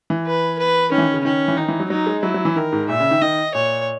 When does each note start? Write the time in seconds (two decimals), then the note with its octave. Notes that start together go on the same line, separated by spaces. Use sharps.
0.10 E3
0.27 B4
0.59 B4
0.92 D#3 C#4
0.98 E3
1.03 D#3
1.14 C#3
1.24 D#3 C#4
1.48 E3
1.57 D#3 D#4
1.68 E3
1.80 F#3
1.90 F#3 D#4
2.06 G#3
2.23 F#3 E4
2.34 F#3
2.45 E3
2.56 D#3 A#4
2.72 G#2
2.88 A#2 E5
3.00 C#3
3.11 D#3
3.21 D#3 D#5
3.55 A#2 C#5